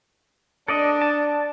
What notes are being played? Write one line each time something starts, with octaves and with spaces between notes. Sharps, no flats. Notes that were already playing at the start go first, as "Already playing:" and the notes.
D4 A4 D5 D#5
A5